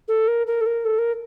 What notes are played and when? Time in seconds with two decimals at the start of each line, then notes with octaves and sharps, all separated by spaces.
0.08 A4
0.28 A#4
0.47 A#4
0.61 A4
0.66 A#4
0.85 A4
0.98 A#4